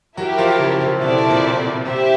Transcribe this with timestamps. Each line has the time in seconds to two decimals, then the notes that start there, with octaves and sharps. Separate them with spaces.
0.17 F#3 E4 F#4 G4 A#4
0.38 F3 F4
0.59 C#3 C#4
0.81 C3 C4
1.01 B2 B3 C4 E4 A4 D5
1.30 A#2 A#3
1.85 C3 C4 E4 G4 C5 E5